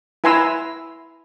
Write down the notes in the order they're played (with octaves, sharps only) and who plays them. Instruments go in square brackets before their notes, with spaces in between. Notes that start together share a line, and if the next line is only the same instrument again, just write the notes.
[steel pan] E4 B4 G#5 A#5 C6 E6